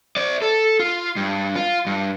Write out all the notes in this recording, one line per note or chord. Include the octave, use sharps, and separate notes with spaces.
C5 D5
A4
F4
G2
F4
G2